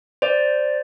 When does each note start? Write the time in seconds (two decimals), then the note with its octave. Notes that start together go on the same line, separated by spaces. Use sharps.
0.22 C5 D5